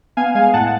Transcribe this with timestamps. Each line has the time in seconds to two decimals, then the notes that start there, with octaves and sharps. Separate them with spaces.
0.17 B3 F5 G#5
0.35 G#3 F5 G#5
0.53 A2 F#5 A5